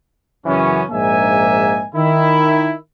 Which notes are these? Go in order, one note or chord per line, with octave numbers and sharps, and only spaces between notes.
F#2 C#3 E3 F#3 B3 C#4
A#1 G#2 A#3 D#4 E5 G#5
D#3 E4